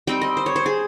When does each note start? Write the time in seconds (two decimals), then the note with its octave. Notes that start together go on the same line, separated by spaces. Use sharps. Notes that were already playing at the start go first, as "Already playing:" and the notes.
0.07 G3 C4 D#4 G5
0.21 D#5
0.37 C5
0.46 C#5
0.56 C5
0.66 G#4